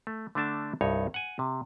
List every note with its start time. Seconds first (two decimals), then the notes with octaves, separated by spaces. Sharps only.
0.07 A3
0.35 D3 A3 D4 A5
0.81 C2 G2 D#4 C#5
1.14 F#5 G#5
1.39 C3